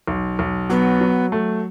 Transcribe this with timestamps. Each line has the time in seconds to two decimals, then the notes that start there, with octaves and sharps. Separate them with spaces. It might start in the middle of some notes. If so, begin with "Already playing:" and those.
0.07 B1
0.39 B1
0.70 F#3 B3
1.01 F#3
1.32 A3